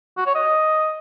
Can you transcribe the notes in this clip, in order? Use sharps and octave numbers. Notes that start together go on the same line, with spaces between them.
F#4
C#5
D#5